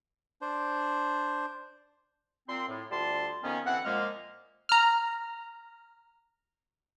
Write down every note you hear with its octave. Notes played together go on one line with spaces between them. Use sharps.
D4 C5
A#2 C4 C6
A2
D2 G3 F4 A5 C6
F2 D#3 B3 C#4
D2 E3 C4 F#5
A#2 F3 G#3 A#3 D#5 F6
A#5 F6